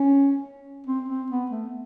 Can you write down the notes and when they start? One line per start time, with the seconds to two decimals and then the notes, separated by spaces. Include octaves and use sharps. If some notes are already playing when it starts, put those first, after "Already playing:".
Already playing: C#4
0.87 C4
1.08 C4
1.30 B3
1.51 A3